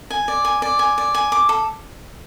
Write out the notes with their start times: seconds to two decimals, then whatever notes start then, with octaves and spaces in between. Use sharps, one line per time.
0.10 G#5
0.28 D5
0.45 G#5
0.62 D5
0.79 G#5
0.98 D5
1.15 G#5
1.32 D6
1.49 A4